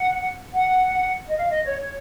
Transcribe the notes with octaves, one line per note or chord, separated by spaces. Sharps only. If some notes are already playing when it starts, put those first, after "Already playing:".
Already playing: F#5
F#5
D#5
F5
D#5
C#5
C#5